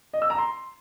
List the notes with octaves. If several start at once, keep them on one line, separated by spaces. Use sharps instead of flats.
D#5
E6
A#5
C6